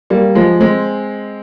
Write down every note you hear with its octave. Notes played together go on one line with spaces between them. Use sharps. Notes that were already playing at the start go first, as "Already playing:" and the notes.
G3 A#3
F3 G#3
G#3 C4